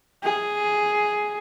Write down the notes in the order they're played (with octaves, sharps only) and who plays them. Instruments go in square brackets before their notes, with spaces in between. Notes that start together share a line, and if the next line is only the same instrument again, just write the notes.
[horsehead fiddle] G#4